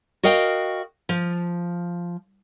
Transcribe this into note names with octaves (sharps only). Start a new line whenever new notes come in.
F#4 A#4 D#5 F5 G5
F3